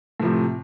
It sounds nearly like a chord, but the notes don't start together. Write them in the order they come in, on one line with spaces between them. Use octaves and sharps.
A2 F3 C3